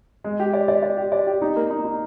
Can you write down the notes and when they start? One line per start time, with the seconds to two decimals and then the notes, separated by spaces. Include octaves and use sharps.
0.24 G#3
0.40 G4
0.53 D5
0.68 D5
0.82 D5
0.97 G4
1.12 D5
1.27 G4
1.42 D#4
1.56 A#3
1.70 D#4
1.85 D#4